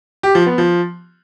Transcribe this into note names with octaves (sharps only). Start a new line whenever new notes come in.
G4
F3
B3
F3